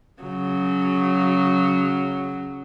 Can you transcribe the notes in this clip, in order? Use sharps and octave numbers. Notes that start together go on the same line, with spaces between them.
C#3 F#3